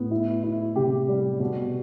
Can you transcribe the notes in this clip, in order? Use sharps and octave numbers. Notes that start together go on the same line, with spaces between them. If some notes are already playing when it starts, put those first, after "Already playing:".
Already playing: A2 B3
E4
E4
C3 G4
G3
B2